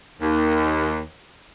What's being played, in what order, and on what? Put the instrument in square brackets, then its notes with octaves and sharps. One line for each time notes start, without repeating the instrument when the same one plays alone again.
[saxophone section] D#2